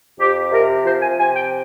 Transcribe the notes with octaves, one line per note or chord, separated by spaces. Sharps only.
F2 G4
C3 A#4
F3 C5
G#5
C3 G#5
G5